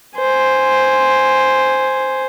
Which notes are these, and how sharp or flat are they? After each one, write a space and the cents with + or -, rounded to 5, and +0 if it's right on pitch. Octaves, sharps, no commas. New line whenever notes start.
C5 +0 G#5 +0